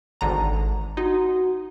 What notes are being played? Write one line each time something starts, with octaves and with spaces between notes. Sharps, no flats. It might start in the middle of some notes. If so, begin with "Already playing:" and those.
G#1 D3 A#5
D#4 F#4